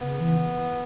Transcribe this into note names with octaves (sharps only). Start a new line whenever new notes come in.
C#3 B3
E3